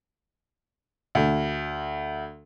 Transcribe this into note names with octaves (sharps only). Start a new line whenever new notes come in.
D2